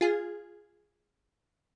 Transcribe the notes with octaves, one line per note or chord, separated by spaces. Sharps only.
F4 G#4